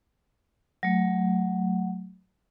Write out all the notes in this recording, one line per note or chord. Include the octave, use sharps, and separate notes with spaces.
F#3 A3